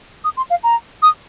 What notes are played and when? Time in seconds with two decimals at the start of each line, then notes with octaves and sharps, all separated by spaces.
0.24 D#6
0.37 C6
0.50 F5
0.63 A#5
1.02 D#6